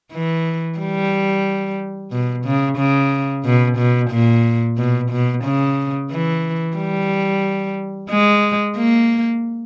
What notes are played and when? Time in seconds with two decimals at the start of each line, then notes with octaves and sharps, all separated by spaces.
0.13 E3
0.79 G3
2.12 B2
2.45 C#3
2.78 C#3
3.45 B2
3.78 B2
4.11 A#2
4.78 B2
5.11 B2
5.44 C#3
6.11 E3
6.77 G3
8.10 G#3
8.77 A#3